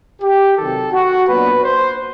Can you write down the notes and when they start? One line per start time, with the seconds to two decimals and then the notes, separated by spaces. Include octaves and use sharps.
0.22 G4
0.57 C3 D#3 F#3 A4
0.93 F#4
1.28 A#2 F#3 B3 D4 B4
1.64 C5